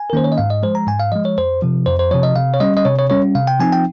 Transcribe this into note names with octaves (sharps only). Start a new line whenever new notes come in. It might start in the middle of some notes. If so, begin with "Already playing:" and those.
Already playing: G#5
A#4
D#3 A#3 C#4 C5
C#5
D#5
G#2 F5
D#5
F3 G#3 C5
A#5
G#2 G#5
F5
F3 G#3 D#5
C#5
F2 C5
C3 F3
F2 C5
C5
C3 F3 C#5
D#5
C3 F5
C#5
G3 C#4 D#5
D#5
C3 C#5
C#5
G3 C#4 C#5
C3 F5
G5
F3 C4 D#4 G#5
G5